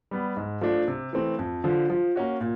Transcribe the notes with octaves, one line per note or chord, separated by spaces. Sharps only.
G3 B3
G#2
F3 A3 D4
C3
E3 A3 C4
F2
D3 F3
F3
A#3 C#4 F#4
A#2